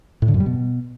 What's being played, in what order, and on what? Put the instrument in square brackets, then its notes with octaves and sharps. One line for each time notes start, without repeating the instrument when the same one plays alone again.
[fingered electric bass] A2
D3
F#2
G3
B2